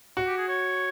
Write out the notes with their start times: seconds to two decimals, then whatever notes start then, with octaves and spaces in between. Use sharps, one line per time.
0.17 F#4
0.27 G4
0.38 G#4
0.48 C#5